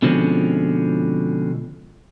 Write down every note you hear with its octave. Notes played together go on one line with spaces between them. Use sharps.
B2 D3 F3 G#3 C4 C#4